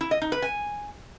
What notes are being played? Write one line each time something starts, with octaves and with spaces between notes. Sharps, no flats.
E4
D#5
D#4
B4
G#5